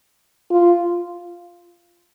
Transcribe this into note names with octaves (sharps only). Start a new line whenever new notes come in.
F4